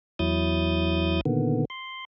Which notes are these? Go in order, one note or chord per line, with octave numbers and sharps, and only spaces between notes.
E2 F#3 E4 D#6 G6 A6
A#2 D3 D#3 B3
C6